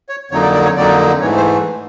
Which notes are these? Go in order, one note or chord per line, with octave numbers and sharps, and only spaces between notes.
C#5
F2 D3 F#3 A#3 D#4 C#5
D5
D5
C#5
F2 D3 F#3 A#3 D#4 D5
G#2 E3 A3 C#5
C5